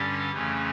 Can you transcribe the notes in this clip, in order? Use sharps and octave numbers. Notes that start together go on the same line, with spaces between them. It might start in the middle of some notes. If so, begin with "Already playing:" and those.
Already playing: G2 D3 G3 C#4 G4
F2 C#3 E3 A3 C#4